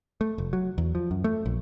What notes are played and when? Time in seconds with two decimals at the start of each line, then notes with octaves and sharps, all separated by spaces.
0.21 A3
0.38 F1
0.53 F#3
0.78 E2
0.95 F3
1.11 F#2
1.24 A3
1.46 A#1